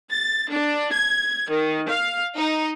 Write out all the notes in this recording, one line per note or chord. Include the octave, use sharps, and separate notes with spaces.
A6
D4
G#6
D#3
F5
D#4